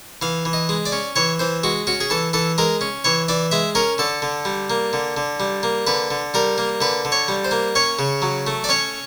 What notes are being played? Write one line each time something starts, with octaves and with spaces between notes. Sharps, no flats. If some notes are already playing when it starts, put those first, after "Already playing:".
E3 F5
E3
D#5
G#3
D5
C#4
E3 C#5
E3 C5
G#3 F#4
C#4 F#4
G#4
E3 A4
E3 A4
G#3 A#4
C#4
E3 C#5
E3 D5
G#3 E5
C#4 A#4
D3 A4
D3
G3
A#3
D3
D3
G3
A#3
D3 B4
D3
G3 A#4
A#3
D3 B4
D3
C#5
G3
C5
A#3
C#4 C#5
C#3
F#3
A3
D5
C#4 C#5